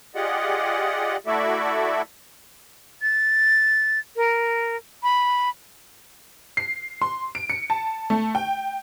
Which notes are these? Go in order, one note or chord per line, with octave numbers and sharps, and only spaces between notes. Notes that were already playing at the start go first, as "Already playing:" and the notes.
F4 G4 G#4 D5 D#5 F#5
A3 E4 F#4 A4 D5 E5
A6
A#4
B5
C7
C6
D7
C#7
A5
A3
G5